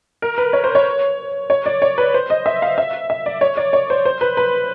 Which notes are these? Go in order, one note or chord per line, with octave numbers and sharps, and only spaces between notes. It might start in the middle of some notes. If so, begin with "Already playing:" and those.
A#4
B4
C#5
C5
C#5
C#5
D5
C#5
B4
C5
D#5
E5
F5
E5
E5
D5
C#5
D5
C#5
C5
C5
B4
B4